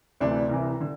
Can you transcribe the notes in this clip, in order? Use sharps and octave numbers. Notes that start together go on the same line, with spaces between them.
D2 C3 E3 D4
C2 C3 E3
D3